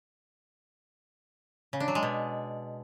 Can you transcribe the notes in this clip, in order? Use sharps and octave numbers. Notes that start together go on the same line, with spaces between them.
C#3
D4
F#3
G#3
B2